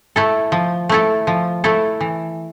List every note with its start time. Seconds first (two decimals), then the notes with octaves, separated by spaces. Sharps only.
0.16 A3 E4 A4
0.52 F3
0.89 A3 E4 A4
1.27 F3
1.64 A3 E4 A4
2.00 E3